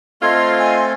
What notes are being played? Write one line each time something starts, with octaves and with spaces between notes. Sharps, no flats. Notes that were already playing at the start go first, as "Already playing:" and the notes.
A3 C4 F4 A4 D#5 F5 C6 G#6
G#5